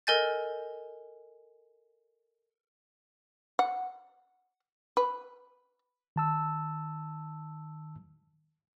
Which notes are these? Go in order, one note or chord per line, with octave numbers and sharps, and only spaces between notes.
A4 A#4 D#5 G#5 G6 A6
F#5
B4
D#3 A5 E6